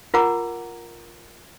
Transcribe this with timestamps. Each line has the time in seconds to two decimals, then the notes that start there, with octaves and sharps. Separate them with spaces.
0.14 F4 A#4 F#5 A#5 D6